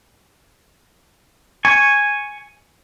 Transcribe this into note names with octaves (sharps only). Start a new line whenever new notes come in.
G#5 C#6